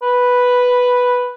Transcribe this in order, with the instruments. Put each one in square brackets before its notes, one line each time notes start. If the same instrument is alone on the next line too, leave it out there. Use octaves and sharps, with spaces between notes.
[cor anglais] B4